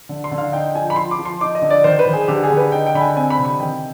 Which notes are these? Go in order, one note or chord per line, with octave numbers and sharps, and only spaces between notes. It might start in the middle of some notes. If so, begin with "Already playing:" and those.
D3
C6
D3
F5
D#4 G5
F3 G#5
B5
F3 C6
D6
F3
C6
D#4 D6
D#5
D3
D5
D#3 C5
B4
D#3
G#4
D3 G4
G#4
D3
B4
D#4 G5
G5
D3 B5
G#5
C4 G#5
B5
C3
B5
D#3 G5